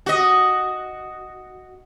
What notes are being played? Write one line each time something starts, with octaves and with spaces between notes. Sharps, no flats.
F#4 D#5